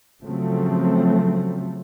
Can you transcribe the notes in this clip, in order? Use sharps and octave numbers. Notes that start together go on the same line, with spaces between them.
C#3 F3 F#3 A3 C4